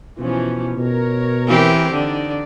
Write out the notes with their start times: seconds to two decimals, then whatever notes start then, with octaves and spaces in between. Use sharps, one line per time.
0.19 B2 E3 F3 C#4
0.77 B2 A#4 C#5
1.47 E3 C4 G4
1.92 D3 D#4 D5